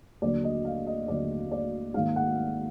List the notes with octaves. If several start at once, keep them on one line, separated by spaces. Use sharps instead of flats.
D#2 D3 F#3 A#3 D5
D#5
F5
D#5
D#2 D3 F#3 A#3 D5
D5
G#2 D#3 A#3 F5
F#5